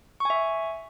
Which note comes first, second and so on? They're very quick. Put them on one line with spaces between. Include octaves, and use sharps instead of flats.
C#6 G#5 E5